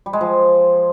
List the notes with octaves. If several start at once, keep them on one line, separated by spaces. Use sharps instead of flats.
G3
G#3
F3